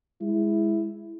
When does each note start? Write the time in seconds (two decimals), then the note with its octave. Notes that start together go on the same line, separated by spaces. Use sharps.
0.21 G#3 E4